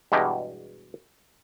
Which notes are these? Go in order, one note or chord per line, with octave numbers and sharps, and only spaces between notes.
E2 G2 B2 G#3 G4